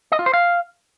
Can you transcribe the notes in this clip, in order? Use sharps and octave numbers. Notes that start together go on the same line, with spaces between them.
D#5
F4
C5
F5